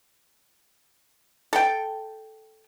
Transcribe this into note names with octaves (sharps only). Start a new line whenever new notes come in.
A4 G5